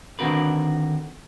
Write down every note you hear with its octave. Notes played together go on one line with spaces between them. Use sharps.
D3 D#3 C4 F#4 A#4 B4